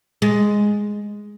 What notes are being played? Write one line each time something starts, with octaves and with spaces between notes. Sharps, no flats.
G#3